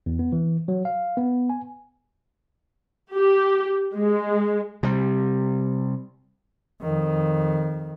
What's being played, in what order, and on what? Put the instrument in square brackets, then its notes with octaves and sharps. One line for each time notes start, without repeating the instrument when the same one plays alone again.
[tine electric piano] E2
B3
E3
F#3
F5
B3
G#5
[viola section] G4
G#3
[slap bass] C3 G3
[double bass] F2 D#3